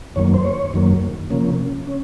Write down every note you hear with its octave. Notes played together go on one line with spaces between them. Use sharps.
F#2 D#3 F#3 A#3 C#5
C5
C#5
F#2 D#3 F#3 A#3
C3 F3 A#3 C#4
C#4